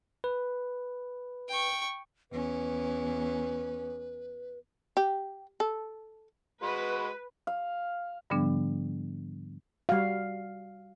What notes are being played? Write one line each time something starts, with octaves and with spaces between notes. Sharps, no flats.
B4
G5 C#6
E2 C#4 B4
G4
A4
G#3 F#4 B4 B5
F5
G#2 D3 F3 G3 B3 D4
G3 F#4 F5